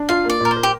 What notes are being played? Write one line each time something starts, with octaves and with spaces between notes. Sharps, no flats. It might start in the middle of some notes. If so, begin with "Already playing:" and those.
Already playing: D4
F4 F5
A#3 D5
A#2 A#4
C5
A#4
G4